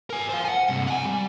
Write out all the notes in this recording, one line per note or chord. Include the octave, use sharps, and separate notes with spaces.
A#4 G#5
C5 F5
F#5 G#5
G2 C3
F#5 G#5
G3